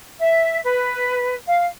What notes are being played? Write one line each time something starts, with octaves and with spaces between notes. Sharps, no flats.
E5
B4
F5